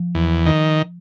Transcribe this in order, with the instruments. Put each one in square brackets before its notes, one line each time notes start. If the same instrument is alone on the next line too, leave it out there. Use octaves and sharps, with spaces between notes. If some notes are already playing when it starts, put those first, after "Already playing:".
Already playing: [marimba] F3
[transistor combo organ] E2
D#3